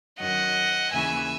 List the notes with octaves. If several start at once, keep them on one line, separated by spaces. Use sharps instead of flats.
F#2 D#3 F#3 D#5 F#5
D#2 C#3 E3 E5 G#5